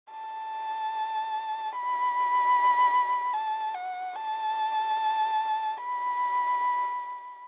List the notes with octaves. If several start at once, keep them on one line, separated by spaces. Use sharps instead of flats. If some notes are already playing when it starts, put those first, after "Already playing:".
A5
B5
A5
F#5
A5
B5